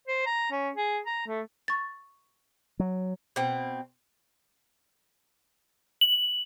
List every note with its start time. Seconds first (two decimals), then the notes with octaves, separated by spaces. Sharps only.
0.08 C5
0.26 A#5
0.51 C#4
0.75 G#4
1.06 A#5
1.27 A3
1.68 C#6 A6
2.80 F#3
3.36 B2 C4
6.01 F#7